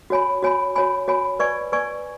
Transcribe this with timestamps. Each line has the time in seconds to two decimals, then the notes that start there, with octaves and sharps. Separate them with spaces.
0.10 F#4 C#5 G#5 B5
0.43 F#4 C#5 G#5 B5
0.76 F#4 C#5 G#5 B5
1.08 F#4 C#5 G#5 B5
1.39 B4 D5 G#5 C#6
1.72 B4 D5 G#5 C#6